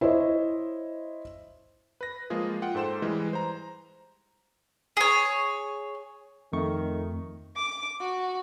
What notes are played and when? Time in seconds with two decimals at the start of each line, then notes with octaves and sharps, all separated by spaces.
0.01 E4 C5 C#5 D#5
2.01 B4 A#6
2.30 F3 G#3 A#3 F4 G#4
2.62 F4 F#5 G5
2.75 G#2 A4 C5 G5 E7
3.02 E3 G3 G#3
3.33 C5 A#5
4.97 G#4 C#5
6.53 F2 D#3 A3 C#6
7.56 D6
8.01 F#4